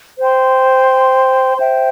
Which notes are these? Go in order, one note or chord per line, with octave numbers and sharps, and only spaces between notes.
C5 G5 C6
C5 E5 G5